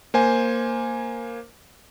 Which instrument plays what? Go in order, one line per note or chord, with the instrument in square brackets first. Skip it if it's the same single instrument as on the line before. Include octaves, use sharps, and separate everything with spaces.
[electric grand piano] A#3 C5 G#5